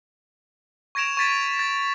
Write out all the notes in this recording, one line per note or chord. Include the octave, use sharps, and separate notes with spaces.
C#6 G#6 A#6 D7 E7 F7
C#6 G#6 A6 B6 D#7 E7
A6